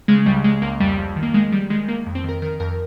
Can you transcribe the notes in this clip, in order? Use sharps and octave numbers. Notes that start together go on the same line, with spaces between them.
C#3 G#3
C#2 G3
C#2 G#3
C#2 A#3
F2 G3
F2
D#3
A#3
D#3 G#3
D#3 G3
D#3 G#3
D#3 A#3
F2
C4
D#3 A#4
D#3 A#4
F2 A#4